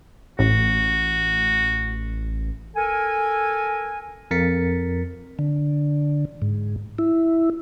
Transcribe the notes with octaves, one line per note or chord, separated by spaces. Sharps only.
A1 F#4
A4 A#4 G#5
F2 A#4 A6 B6 C#7
D3
G#2
E4